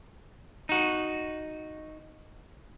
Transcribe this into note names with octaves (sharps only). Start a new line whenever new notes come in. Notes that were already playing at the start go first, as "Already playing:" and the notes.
D#4 F#4